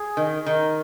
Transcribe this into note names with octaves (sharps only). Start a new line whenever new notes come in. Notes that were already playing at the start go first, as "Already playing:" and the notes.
Already playing: G#4
D#3
D#3 A#4